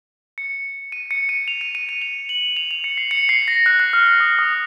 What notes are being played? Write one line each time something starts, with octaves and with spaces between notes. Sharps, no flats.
C#7
D#7
C#7
D#7
F7
D#7
D#7
D#7
F7
F#7
F7
F7
C#7
C7
C#7
C7
A#6
F#6
F#6
F6
F6
D#6
D#6